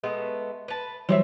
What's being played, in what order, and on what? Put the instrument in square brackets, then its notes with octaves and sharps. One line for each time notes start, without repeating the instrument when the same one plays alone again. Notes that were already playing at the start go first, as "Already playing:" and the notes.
[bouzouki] G#3 A3 B3
B4 A5
[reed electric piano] E3 F#3 G3 [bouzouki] C4 C#5 E5